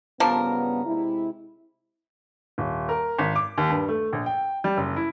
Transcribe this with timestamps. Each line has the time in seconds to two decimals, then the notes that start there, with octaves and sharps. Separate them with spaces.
0.20 G2 C#3 F3 B3 D4 A#4
0.85 C3 G#3 E4
2.58 D#1
2.89 A#4
3.19 G#1
3.36 D6
3.58 D#2
3.70 G2
3.89 A3
4.13 A#1
4.26 G5
4.64 G3
4.77 F#1
4.96 E4